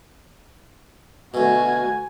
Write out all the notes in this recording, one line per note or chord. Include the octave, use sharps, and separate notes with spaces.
D2 B2 F#4 G#5